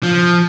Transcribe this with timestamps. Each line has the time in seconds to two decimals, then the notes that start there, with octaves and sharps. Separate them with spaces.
0.03 F3